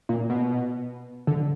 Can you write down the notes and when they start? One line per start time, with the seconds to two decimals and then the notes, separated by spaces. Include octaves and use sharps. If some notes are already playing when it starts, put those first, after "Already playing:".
0.09 A#2
0.30 B2
1.27 D3